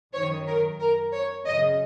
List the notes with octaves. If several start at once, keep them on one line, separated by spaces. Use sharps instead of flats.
F#2 D#3 C#5
A#4
A#4
C#5
F#2 C#3 D#5